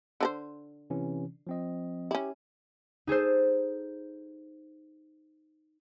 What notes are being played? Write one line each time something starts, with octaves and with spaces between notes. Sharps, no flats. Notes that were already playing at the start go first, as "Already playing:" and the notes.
D3 D4 C5
C3 E3 C#4
F3 C4 D#5
C#4 E4 G4
D#4 G#4 A4 C5